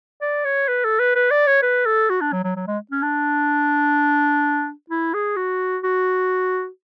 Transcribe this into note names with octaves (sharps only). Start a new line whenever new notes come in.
D5
C#5
B4
A4
B4
B4
D5
C#5
B4
A4
F#4
D4
F#3
F#3
F#3
G#3
C#4
D4
E4
G#4
F#4
F#4